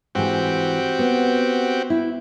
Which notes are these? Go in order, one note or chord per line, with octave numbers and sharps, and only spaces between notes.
G#2 E3 C4 F#4 G4
B3
E4